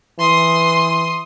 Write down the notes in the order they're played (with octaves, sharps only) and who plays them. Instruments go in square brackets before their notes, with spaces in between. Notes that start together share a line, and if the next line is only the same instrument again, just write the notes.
[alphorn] E3 [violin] C6 D#6